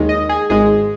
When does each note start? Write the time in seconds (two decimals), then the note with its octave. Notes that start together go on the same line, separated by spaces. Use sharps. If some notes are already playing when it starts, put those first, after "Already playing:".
Already playing: D#2 D#3 G#3
0.09 D#5
0.29 G#4
0.50 G#1 G#2 G#3 G#4